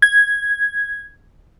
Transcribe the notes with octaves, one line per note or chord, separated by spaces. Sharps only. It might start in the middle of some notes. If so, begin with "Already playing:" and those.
G#6